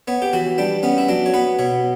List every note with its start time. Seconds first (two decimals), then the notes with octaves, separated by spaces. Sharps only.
0.08 B3 C#5
0.22 G4
0.33 E3 F#4
0.58 G3 D4
0.83 B3 C#4
0.98 E4
1.09 F#3 D4
1.26 C#5
1.34 B3 B4
1.59 B2 C#5